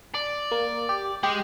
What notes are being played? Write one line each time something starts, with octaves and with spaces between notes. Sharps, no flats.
D5
A#3
G4
G#3 G4